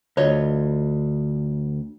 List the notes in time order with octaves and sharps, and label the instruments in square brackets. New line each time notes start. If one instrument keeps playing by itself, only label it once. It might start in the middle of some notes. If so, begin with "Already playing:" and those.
[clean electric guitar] D2 [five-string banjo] F4 C#5 D#5